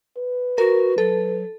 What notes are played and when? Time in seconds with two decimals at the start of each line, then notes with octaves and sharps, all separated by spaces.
0.17 B4
0.58 F#4 A#4
0.98 F#3 A4